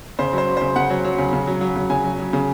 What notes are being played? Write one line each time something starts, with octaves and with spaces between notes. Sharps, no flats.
C#3 C5
F#3 C5
F#3
C#3 C5
C#3 F#5
F#3
F#3
C#3
C#3
F#3
F#3
C#3
C#3 G#5
F#3
F#3
C#3